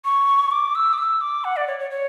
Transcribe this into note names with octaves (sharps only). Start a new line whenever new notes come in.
C#6
D6
E6
D6
E6
D6
F#5
D5
C#5
C#5
C#5